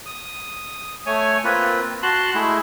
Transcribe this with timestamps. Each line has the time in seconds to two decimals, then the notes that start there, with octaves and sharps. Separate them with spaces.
0.06 D#6
1.06 A3 C#5 G#5
1.44 A#3 C4 F4 B4
2.03 F#4 A5 C6 F#6
2.35 G#3 A3 E4 G#4